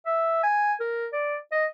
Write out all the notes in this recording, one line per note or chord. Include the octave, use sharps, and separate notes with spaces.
E5
G#5
A#4
D5
D#5